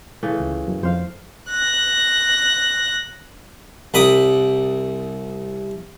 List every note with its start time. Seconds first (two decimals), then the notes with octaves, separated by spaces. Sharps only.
0.23 C#3 E3 A3
0.40 C#2
0.68 F#2
0.83 F2 C5 F5
1.49 F#6 A#6
3.94 C2 B5 D6 D#6